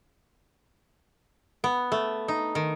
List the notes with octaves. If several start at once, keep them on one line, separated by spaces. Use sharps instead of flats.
B3
A3
D#4
D#3